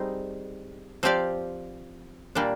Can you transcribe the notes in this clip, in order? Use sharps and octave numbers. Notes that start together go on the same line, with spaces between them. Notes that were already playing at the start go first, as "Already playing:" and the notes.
Already playing: G3 C4 D#4 G#4
F3 C4 G4 D5 F5
A#2 G3 A#3 D4